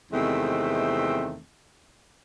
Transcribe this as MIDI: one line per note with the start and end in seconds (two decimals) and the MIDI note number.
0.12 1.38 40
0.12 1.38 48
0.12 1.38 51
0.12 1.38 56
0.12 1.38 57
0.12 1.38 60